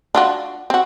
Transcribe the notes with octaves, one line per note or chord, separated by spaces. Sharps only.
D4 F4 F#4
C4 F#4